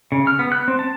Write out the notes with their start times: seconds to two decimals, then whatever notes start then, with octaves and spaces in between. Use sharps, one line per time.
0.12 C#3
0.27 F6
0.39 B3
0.52 F#6
0.68 C4
0.79 A5